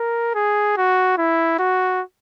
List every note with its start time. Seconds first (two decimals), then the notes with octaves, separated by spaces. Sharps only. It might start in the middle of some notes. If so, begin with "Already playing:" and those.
Already playing: A#4
0.35 G#4
0.77 F#4
1.18 E4
1.59 F#4